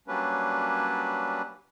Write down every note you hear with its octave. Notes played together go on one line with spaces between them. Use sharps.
F#3 G3 A#3 C#4 D4 B4